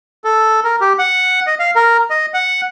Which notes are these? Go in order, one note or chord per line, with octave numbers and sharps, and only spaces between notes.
A4
A#4
G4
F#5
D#5
F5
A#4
D#5
F#5